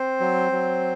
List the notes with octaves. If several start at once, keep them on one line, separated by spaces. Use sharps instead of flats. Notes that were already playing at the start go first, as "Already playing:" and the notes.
Already playing: C4 C5
F#3
F#3